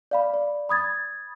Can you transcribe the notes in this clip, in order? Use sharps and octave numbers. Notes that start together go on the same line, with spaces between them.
D5 F5 B5
D5
B5 D#6 G#6 A6